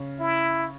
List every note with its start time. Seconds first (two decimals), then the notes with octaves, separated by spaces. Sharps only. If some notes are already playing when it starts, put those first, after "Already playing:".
Already playing: C#3
0.20 E4